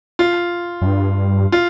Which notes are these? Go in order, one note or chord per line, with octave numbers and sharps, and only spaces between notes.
F4
F#2
G2
F4